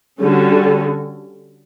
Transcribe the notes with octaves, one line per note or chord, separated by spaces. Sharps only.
D3 G3 C#4 F#4 A4